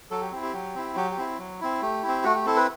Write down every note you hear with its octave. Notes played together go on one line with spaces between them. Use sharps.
F#3 A4
G4
C4 E4 G4
G4
F#3
C4 E4
F#3 G4
G4
C4 E4
F#3
C4 E4
A3 G4
C4 E4
A3 F#4
G4
C4 E4 A4
B4